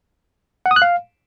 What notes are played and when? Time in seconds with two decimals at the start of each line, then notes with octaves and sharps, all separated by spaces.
0.66 F#5
0.71 D#6
0.76 F#6
0.82 F5